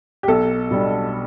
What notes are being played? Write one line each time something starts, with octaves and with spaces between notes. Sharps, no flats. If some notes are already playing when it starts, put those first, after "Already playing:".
G4
B1 A4
B2 G3 D4